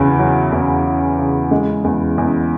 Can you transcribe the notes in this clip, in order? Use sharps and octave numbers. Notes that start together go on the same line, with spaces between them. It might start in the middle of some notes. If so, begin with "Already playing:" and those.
Already playing: E2 C#3 F#3 E4
F#3
E2
E4
C#3
G#3
E2
E2